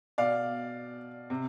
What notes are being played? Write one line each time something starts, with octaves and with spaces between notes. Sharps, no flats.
B2 D5 F5
C3